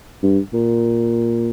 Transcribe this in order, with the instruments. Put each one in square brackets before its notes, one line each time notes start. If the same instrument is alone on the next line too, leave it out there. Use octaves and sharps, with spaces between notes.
[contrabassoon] G2
A#2